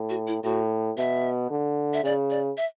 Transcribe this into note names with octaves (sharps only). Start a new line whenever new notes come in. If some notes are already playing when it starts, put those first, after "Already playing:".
Already playing: A2
F#4
E4
A2 F#4
B2 E5
D3
E5
C#3 D5
D5
E5